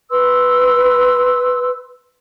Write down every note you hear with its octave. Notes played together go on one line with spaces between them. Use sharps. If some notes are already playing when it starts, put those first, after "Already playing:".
B4 C6 E6